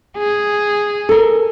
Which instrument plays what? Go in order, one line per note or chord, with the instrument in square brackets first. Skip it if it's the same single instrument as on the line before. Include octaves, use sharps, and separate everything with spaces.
[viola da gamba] G#4
[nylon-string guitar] A4 A#4